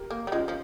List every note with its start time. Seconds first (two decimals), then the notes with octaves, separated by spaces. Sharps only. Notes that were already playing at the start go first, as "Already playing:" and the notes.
Already playing: G4 A#4
0.11 A#3
0.27 G3
0.31 G#3 C#4 F4
0.48 F3